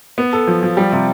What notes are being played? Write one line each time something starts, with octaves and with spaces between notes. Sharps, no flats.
B3
A4
F3
F3
G3
C3